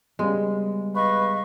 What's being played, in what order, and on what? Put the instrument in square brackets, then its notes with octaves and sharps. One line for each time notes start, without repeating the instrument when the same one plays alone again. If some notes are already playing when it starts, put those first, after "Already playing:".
[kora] C#3 G#3 [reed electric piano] G3 B3 G#4
[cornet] B4 [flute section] D#5 F5 C#6